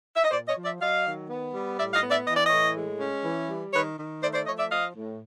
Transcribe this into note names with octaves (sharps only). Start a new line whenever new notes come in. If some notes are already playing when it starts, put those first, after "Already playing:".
E5
D#5
A#2 C5 D5
C#5 D#5
F3
D5 E5
F#3 D#5 F5
D#3
B3
G3
A2 D5 E5
D#5 F5
B3
D5 E5
E3 D#5
D5
A2 C#5 D#5
G#3
C#4
E3
G3
D#3 B4 C#5
D#3
A3 C5 D5
C5 D5
F3 C#5 D#5
D5 E5
F3 D#5 F5
A2